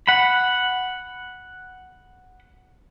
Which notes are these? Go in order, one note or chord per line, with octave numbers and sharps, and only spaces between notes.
F#5 B5